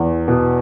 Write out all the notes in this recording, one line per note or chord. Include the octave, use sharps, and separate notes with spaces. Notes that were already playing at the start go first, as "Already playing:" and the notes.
Already playing: E2
B2